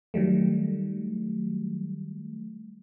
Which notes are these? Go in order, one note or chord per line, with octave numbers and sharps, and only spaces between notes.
D#3 F#3 G3 A3